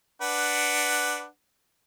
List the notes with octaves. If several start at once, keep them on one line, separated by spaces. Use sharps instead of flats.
D4 B4 F#5